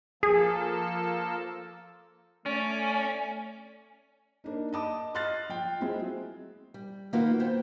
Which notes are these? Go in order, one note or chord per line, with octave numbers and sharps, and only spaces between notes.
F3 A#3 G#4 A4
A3 C#4 D5
A#3 D4 D#4
D#5 A5 D6 D#6
D#5 C6 F6 F#6 A6 C7
F3 G5
F#3 G#3 C4 E4 F4 G#4
G3
D#3 A#3 D#4 F4 F#4 B4
B3 C5 G5